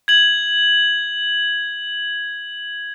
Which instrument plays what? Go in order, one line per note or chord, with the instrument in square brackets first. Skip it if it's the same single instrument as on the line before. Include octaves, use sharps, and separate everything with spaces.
[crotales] G#6 F#7